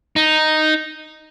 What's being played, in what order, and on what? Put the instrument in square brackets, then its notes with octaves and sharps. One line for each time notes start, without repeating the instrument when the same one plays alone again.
[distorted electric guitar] D#4